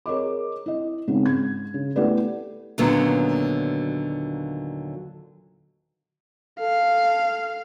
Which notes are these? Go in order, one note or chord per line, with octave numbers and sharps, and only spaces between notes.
G#4 A#4 C#5 D#5 D6
E4 D#5
G#1 C#3 B3 D#4
G#2 G#6
C#3
A3 B3 E4 G4 B4 D5
D#2 A#2 D3 F#3 B3 C#4
A4 F5